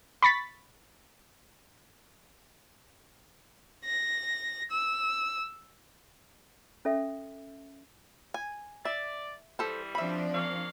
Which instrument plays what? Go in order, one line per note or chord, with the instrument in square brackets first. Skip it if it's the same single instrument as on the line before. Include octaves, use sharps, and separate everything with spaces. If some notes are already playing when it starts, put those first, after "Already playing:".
[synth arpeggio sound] B5 C#6 A6 B6
[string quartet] A#6
E6
[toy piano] C#4 A4 E5
[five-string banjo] G#5
[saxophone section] D5 [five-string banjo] E5
[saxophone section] E3 G3 [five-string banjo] A4 C5
[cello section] F3 C4 D4 [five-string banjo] E5 B5
[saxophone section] A#3 C#4 F5